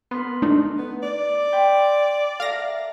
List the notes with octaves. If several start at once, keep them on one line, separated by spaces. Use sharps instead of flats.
B3 A#4 B4 C6
A3 D4 D#4
B3
D5
G5 B5 C6
A4 A#4 E5 F5 A#6